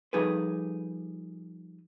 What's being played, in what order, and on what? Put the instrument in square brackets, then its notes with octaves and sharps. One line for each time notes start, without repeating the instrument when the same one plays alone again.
[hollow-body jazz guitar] F3 G3 D#4 G#4 A4 B4